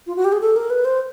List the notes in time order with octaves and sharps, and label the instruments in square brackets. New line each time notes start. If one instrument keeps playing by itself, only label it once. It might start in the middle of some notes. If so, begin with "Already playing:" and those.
[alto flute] F4
F#4
G4
G#4
A4
A#4
B4
C5